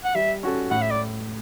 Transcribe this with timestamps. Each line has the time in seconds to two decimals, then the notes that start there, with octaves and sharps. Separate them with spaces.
0.04 F#5
0.15 G3 E5
0.43 C#4 F#4 A4
0.71 A2 F#5
0.82 E5
0.91 D5